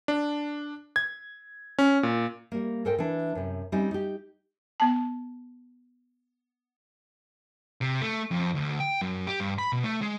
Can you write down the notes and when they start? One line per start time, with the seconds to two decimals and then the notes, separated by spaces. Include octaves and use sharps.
0.08 D4
0.96 G#6
1.79 C#4
2.03 A#2
2.52 G3 A#3
2.85 G#2 A4 A#4 C5 G5
2.98 E3 D4
3.35 F#2 C3
3.72 G3 C4 C#4 D#4
3.91 D#4 G4
4.80 B3 A5
7.81 C3
8.01 A3
8.31 F2
8.55 D2
8.80 G5
9.01 F#2
9.27 G4
9.40 G2
9.58 B5
9.73 B2
9.84 A3
10.02 G#3